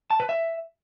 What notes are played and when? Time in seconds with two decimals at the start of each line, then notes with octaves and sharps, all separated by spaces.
0.10 A5
0.20 B4
0.29 E5